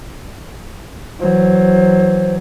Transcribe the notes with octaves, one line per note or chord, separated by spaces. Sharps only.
E3 F#3 C5